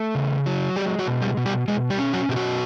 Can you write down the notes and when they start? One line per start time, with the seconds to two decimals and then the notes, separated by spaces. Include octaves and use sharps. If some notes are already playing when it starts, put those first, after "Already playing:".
Already playing: A3
0.15 C#3
0.46 F#3
0.76 G3 G#3 G4
0.99 F#3 F#4
1.07 B2
1.21 G3 G4
1.37 B2
1.45 G3 G4
1.68 B2 G#3 G#4
1.90 G3 G4
1.98 C#4
2.13 F#3 F#4
2.29 B2 G4
2.36 F#3 F#4